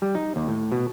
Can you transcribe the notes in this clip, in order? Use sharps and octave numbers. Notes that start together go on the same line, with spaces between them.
G3
D#4
D#2
A2
B2